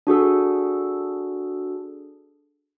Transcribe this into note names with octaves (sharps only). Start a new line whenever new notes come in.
D4 F#4 G#4 A4